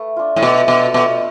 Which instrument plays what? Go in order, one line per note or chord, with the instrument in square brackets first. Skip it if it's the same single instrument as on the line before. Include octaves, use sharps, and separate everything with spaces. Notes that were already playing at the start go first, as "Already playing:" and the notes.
Already playing: [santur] A3 B4
D4 F4
[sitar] A2
[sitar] B2 [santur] A3
[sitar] B2 [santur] D4 F4
[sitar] B2 [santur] A3